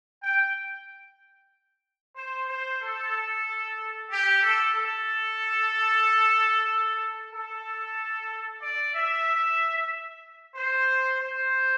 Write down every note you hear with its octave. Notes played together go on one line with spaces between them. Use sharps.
G5
C5
C5
A4
G4
A4
A4
A4
D5
E5
C5
C5